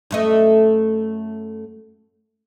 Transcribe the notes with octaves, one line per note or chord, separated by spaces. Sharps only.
F#2 A3 D#5